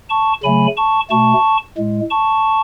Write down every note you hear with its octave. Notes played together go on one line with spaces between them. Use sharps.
A5 C#6
C#3 F#3 A3 G#5 B5
A5 C#6
B2 A3 A5 C#6
A2 G#3
A5 C#6